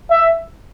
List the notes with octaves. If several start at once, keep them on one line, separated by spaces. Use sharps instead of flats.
E5